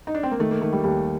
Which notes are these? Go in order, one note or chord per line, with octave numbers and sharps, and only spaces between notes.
D#4
D4
C4
A#3
D#3 A3
A#3
D#3 A3
G3
D#2 G3